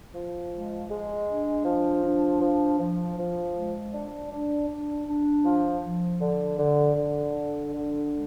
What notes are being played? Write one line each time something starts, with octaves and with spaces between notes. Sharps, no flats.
F3
G#3
G#3
D4
F3
D4
F3
F3
F3
G#3
D4
D4
D4
D4
F3
F3
D3
D3
D3
D4
D3
G#3